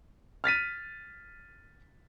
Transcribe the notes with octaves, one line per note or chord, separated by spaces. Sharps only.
F6 A6 B6 D#7